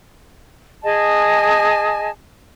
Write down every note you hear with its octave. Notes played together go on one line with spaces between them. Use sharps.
G#4 D#5 G#5 A5